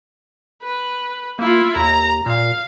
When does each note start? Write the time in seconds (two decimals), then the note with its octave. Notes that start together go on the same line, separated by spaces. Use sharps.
0.63 B4
1.39 A#3 E4 F4
1.76 D#2 A#5
2.26 A#2 F5